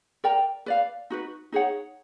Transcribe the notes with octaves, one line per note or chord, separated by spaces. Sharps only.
A#4 D5 G5 A#5
B4 D5 F5
D#4 F#4 B4
D#4 G#4 C#5 F#5